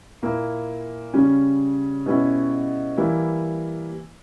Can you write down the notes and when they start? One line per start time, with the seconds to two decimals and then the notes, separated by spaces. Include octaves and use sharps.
0.22 A#2 A#3 E4
1.14 C#3 G3 C#4
2.06 B2 G3 C#4 E4
2.97 E3 G3 A#3 E4